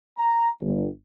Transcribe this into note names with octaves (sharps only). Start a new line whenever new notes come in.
A#5
G1